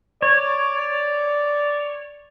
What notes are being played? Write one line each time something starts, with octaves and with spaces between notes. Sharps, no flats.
C#5 D5